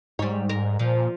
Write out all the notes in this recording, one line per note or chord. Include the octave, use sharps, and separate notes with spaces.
G#2 G3 C#5
A#4
A#2 F3